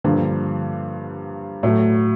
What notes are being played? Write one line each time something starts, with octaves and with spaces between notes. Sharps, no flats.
G2 D3 F3 A#3
A2 F#3 A3